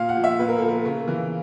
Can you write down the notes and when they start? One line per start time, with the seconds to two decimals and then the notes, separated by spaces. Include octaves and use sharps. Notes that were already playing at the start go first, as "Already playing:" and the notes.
Already playing: A#2 F5
0.09 F#5
0.17 F3
0.24 E5
0.39 A#2 B4
0.48 A#4
0.58 F3 A4
0.68 A#4
0.85 C#3 A#4
1.08 E3